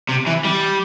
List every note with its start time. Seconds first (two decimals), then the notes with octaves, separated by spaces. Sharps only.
0.09 C3
0.26 E3
0.44 G3